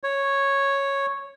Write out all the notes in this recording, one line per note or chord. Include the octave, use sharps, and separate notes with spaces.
C#5